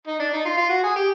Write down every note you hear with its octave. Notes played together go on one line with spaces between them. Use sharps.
D#4
D4
D#4
F4
F4
F#4
G#4
G4